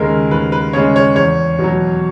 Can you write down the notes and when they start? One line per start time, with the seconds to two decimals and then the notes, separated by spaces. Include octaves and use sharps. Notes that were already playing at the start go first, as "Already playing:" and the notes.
Already playing: D#2 C#3 G#3 A#4
0.31 D#2 B4
0.52 B4
0.73 C#3 G#3 C#5
0.96 C#5
1.16 E2 C#5
1.58 B2
1.64 F#3